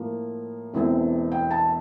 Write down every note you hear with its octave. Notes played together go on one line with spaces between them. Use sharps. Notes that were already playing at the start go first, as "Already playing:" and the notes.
Already playing: A2 F3 A#3
E1 E2 E3 A3 C4
G5
A5